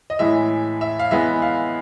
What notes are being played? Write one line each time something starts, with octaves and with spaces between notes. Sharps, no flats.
D#5
A2 E3 G#3 E5
E5
F5
E3 G#3 B3 E5
F5